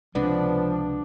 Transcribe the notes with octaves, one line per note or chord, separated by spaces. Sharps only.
C#2 C3 F3 G#3 B3 D4